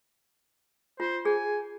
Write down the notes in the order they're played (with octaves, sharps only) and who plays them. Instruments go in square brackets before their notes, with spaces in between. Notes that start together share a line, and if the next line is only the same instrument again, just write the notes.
[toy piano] F4 [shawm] C5
[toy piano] G#4 [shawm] G#5